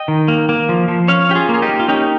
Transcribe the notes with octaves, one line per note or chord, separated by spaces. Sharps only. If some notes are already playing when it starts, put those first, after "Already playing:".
Already playing: D#5 G5
D#3
A#3
A#3
F3
F3
C#4 C#5 F5
C#4 G4
F4 G#4
A#3
G#4
D#4 G4
A#3
F4
C#4 D#4 G4